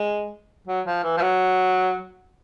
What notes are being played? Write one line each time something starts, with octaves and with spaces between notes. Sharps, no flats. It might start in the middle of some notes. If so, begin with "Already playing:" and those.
Already playing: G#3
F#3
F3
E3
F3
F#3